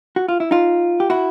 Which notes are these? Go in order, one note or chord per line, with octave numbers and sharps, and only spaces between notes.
F#4
F4
E4
D#4 F4
G4
E4 F#4